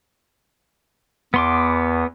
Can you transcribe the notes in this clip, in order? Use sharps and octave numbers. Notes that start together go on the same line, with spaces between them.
E2 B3 C6 D6